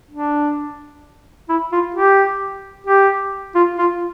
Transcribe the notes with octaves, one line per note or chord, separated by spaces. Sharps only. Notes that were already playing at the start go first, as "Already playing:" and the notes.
D4
E4
F4
G4
G4
F4
F4